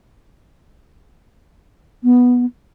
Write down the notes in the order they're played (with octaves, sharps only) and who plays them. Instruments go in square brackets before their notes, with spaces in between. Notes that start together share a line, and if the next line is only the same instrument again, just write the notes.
[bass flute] B3